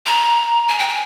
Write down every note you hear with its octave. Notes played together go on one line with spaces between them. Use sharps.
A#5
G#5
G5
G#5